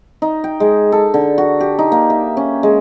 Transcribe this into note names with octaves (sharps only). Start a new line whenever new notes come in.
D#4
G5
G#3
A4
D3
F#4
G4
D#4
A#3
E5
C#4
G#3